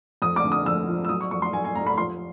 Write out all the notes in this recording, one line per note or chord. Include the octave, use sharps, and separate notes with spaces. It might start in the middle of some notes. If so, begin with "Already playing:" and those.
F2 D#6
D6
D3
D#6
F2 E6
F3
E6
F#3 D#6
C#6
F2 C#6
C6
F#3 G#5
G#5
F1 A#5
B5
F3 C6